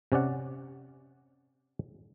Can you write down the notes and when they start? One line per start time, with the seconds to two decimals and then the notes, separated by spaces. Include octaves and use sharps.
0.12 C3 C#4 D5 F#5